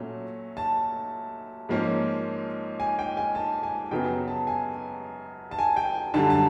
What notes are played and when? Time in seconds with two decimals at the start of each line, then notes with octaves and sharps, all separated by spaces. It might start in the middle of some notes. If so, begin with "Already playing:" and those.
Already playing: A#2 F#3 A3 C#4
0.57 A5
1.69 G#2 F3 A#3 C#4
2.80 G#5
2.99 G5
3.17 G#5
3.35 A5
3.63 G#5
3.91 F#2 C#3 F#3 B3 G5
4.28 A5
4.47 G#5
5.51 A5
5.59 G#5
5.76 G5
6.14 F#2 D3 G3 A5
6.30 A5